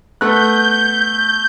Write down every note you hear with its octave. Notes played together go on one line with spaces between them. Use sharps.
A3 B3 F#6 G6